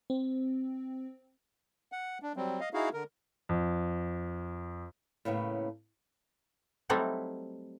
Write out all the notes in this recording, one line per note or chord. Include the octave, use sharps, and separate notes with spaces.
C4
F#5
D4
F#3 G3 C4
D#5 F5
D#4 E4 F#4 G#4 F5
D3 A#4
F2
A2 C#3 A#3 B3
F#3 G3 A3 C4 D#4 E4